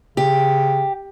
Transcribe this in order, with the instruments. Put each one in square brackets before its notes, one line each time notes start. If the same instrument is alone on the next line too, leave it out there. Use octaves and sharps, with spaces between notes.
[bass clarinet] C#3 [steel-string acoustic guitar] G4